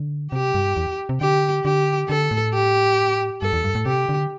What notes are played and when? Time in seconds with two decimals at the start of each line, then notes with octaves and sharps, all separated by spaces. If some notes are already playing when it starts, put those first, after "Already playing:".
Already playing: D3
0.32 C3 G4
0.54 G2
0.77 E2
1.09 C3
1.21 D3 G4
1.64 D3 G4
2.09 D3 A4
2.31 A2
2.54 G4
3.42 G2 A4
3.53 E2
3.64 G2
3.75 A2
3.86 C3 G4
4.09 D3